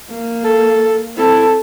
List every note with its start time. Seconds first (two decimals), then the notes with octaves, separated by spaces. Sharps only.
0.10 A#3
0.43 A4
1.16 C4 E4 A4